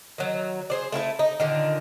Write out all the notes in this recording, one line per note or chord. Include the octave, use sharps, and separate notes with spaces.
D#3 F#3
G#4 C5 D5
A3 E4 F4 A4
D#4
A#2 D3 D#3